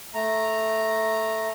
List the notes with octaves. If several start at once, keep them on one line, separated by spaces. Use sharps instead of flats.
A3 A#5